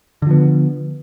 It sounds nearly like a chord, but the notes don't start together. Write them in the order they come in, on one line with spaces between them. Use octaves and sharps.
D3 F3 B3